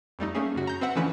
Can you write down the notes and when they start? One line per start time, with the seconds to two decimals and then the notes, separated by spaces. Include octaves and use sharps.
0.19 F2 G3 A3 D#4
0.35 A3 A#3 C#4 G#4
0.55 F#2 C#3 F#4
0.67 A#5 G6
0.81 C4 B4 E5 F#5
0.95 D3 E3 F3 A3 C#4 B4